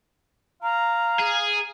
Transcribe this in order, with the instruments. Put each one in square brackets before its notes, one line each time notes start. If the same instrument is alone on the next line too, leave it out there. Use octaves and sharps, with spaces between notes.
[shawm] F5 [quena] A#5
[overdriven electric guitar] G#4